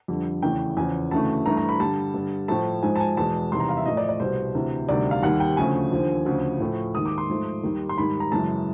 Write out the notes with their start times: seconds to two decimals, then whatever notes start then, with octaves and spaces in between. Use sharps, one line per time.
0.08 F2 D3 G3
0.43 E2 C#3 E3 A3 G5
0.77 E2 C#3 F3 G#5
1.11 D2 C#3 E3 A3 A5
1.46 G2 E3 A3 A#5
1.57 A#5
1.69 B5
1.80 G2 D3 G3 A5
2.14 G2 D3 G3
2.48 A2 F3 A3 A5
2.83 G#2 F3 G#3 G#5
2.96 A5
3.00 G#5
3.17 E2 B2 G#3 A5
3.52 E2 C3 D#3 G3 C6
3.60 A#5
3.69 F5
3.77 E5
3.86 A2 F3 A3 D#5
3.97 D5
4.09 D5
4.20 C2 B2 G3 C5
4.54 D2 C3 E3
4.89 D2 C3 D#3 G3 D5
5.11 F5
5.23 D#2 D#3 G3 F#5
5.40 G5
5.57 D2 C#3 F3 A3 G#5
5.92 D#2 D3 F3
6.26 D2 C#3 F3
6.60 A2 F3 A3
6.94 D#2 D#3 G#3 D#6
7.05 D6
7.18 C6
7.29 G#2 F3 A3
7.63 D#2 D#3 G3
7.89 C6
7.98 G#2 D#3 G3 B5
8.20 A#5
8.32 F#2 C#3 E3 G#3 A5